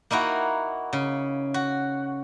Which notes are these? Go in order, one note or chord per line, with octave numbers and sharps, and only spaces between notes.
A#3 D#4 E4 F#4
C#3
F#4